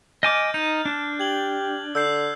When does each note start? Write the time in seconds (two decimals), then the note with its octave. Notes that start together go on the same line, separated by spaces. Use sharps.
0.23 D#5 G#5 D6 F6 G6 A6
0.54 D#4 G6
0.85 D4 F#6
1.20 G4 G#6 F#7 G7
1.95 D3 E6 G6 C7